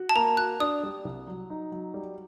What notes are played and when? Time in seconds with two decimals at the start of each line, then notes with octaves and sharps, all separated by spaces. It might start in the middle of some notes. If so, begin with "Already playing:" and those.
Already playing: F#4
0.09 A5
0.16 A#3 A#5
0.37 F#4 F#6
0.60 D4 D#6
0.83 G3
1.05 C2
1.27 F#3
1.50 D#4
1.72 F#3
1.94 G3